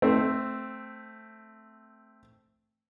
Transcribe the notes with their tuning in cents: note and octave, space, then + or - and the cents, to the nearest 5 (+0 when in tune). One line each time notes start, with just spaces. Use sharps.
A3 +0 C4 +0